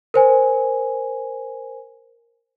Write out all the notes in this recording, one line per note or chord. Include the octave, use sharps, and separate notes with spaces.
A#4 C5 G#5